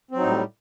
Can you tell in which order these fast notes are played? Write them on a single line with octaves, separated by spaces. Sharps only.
C4 F#3 D#4 A2 G3